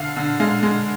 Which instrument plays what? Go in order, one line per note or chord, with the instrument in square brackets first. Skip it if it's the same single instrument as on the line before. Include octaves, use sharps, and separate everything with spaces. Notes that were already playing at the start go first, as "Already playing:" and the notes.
Already playing: [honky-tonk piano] D3 F5
D3
G#3 F5
G#3